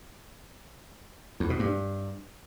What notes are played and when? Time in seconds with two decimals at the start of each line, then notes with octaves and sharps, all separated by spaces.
1.40 E2
1.50 B2
1.59 G2